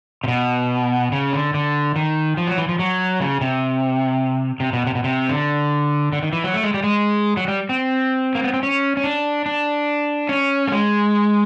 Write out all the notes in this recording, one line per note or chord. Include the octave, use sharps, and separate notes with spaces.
C3
B2
C#3
D3
D3
D#3
F3
F#3
E3
F3
F#3
C#3
C3
C3
B2
C3
B2
C3
D3
D3
D#3
E3
F#3
A3
G#3
G3
G#3
F#3
G3
C4
A#3
B3
C4
C#4
C#4
D4
D4
C#4
A3
G#3